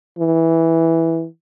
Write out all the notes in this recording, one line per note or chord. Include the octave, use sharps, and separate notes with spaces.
E3